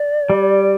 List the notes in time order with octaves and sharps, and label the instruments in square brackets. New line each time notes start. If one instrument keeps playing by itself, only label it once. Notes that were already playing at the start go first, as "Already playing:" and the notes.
Already playing: [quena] D5
[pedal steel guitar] G3